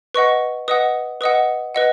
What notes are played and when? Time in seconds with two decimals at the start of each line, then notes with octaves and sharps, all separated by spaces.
0.14 B4 D#5 F#5 C#6
0.68 B4 D#5 F#5 D#6
1.21 B4 D#5 F#5 D#6
1.75 B4 D#5 F#5